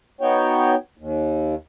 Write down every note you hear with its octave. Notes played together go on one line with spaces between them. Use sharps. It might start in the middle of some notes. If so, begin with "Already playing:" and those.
B3 D#4 F#4 C#5 G5
D#2